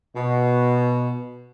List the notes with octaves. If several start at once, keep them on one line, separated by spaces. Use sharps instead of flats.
B2